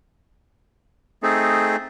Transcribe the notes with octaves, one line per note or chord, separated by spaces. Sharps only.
A3 C4 D#4 G#4